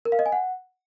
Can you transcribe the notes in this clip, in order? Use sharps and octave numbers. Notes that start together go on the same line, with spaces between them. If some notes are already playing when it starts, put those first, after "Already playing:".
A#4
F5
D#5
G#5
F#5